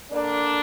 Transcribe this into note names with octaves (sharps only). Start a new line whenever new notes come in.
D3 A#3 D4